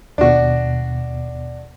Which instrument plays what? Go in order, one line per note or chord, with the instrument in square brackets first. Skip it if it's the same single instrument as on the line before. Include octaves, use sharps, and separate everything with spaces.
[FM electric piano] D#2 B2 [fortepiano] D4 F#4